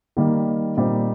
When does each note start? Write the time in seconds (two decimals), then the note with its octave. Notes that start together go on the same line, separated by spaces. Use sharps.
0.17 D#3 G3 A#3
0.77 A#2 G3 C4 D#4